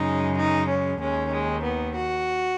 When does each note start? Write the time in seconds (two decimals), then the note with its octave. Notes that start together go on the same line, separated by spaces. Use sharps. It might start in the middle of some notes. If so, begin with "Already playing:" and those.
Already playing: F#2 C#3 G#3 D#4
0.38 D#4
0.69 C#4
1.01 D#2 D#3 G#3 C#4
1.33 G#3
1.64 B3
1.97 F#4